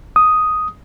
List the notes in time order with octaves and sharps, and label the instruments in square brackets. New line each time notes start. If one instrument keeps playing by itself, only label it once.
[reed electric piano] D#6